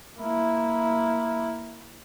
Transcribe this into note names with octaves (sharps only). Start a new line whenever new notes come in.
A#3 E4